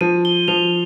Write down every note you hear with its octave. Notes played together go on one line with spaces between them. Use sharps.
F3 D#7
G7
F3 F7